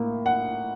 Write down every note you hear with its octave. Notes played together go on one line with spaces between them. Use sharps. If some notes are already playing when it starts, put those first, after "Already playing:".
Already playing: A2 A#3
F#5